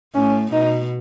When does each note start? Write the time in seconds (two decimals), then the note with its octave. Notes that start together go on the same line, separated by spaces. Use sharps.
0.14 A2 C#4
0.52 B2 D#4